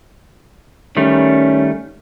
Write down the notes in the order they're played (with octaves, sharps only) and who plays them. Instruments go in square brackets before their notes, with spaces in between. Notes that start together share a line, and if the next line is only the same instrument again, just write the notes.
[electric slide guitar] D#3 G3 A3 [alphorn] C#4